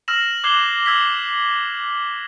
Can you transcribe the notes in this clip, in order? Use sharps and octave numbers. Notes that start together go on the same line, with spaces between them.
E6 F6 A#6 E7 F#7
D6 F#6 G#6 C7 G7
E6 G#6 B6